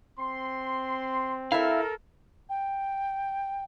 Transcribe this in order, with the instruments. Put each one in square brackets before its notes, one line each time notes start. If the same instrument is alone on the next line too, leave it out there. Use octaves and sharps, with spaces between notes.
[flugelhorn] C4 [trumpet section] C6
[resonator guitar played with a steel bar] E4 E5 [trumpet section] A4 A#4 [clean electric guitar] F5
[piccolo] G5